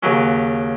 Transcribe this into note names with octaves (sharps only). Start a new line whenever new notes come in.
D#2 C#3 F#3 C#4